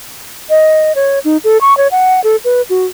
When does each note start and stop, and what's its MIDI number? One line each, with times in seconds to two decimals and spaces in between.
0.50 0.92 75
0.95 1.19 73
1.25 1.37 63
1.44 1.58 69
1.61 1.76 85
1.77 1.88 73
1.91 2.21 78
2.24 2.36 69
2.44 2.62 71
2.70 2.86 66